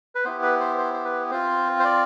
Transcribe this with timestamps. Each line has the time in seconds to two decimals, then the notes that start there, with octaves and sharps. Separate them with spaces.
0.15 B4
0.25 B3 E4 G4 C5
0.42 B4
0.60 C5
0.78 C5
0.94 C5
1.05 B4
1.31 C4 F4 C5
1.80 C5
1.84 D5